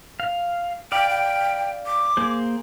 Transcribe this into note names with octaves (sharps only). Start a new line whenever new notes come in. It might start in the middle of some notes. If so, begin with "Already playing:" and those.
F5
D5 F5 G5 B5
G5
D6
A#3 G#4 C5